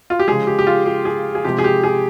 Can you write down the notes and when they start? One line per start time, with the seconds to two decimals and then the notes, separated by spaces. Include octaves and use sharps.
0.10 F4
0.19 G4
0.27 C#3 F3 G#3 G#4
0.47 G4
0.59 G4
0.67 F4
0.86 G4
1.05 G#4
1.35 G#4
1.45 C3 F3 G#3 G4
1.59 G#4
1.64 G4
1.84 G#4